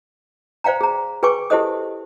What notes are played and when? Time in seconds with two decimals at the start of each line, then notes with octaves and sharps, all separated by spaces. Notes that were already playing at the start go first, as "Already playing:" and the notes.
0.64 C5 D5 F5 G5 A#5
0.81 G#4 A#5
1.23 G#4 B4 G5 G#5 C#6 D6
1.50 E4 G4 A4 C5 D#5 D#6